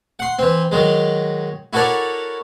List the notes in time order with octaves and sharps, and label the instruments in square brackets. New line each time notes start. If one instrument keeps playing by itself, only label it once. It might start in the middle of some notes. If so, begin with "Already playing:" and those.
[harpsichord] F#5 C6
E3 C4
D#3 F#3 G#3
E4 F#4 A4 A#4 C#5 D5